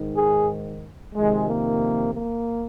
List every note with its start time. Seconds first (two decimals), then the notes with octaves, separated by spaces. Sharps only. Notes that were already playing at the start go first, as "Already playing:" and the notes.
Already playing: G#2 D#3
0.16 G#4
1.15 F2 C3 D#3 G#3
1.48 A#3
2.14 A#3